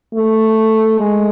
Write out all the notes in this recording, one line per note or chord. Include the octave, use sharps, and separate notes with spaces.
A3
G#3